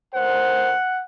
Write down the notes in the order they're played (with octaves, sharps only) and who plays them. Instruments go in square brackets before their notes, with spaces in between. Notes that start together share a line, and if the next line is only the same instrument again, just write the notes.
[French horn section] D2 A#4 C5 [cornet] F#5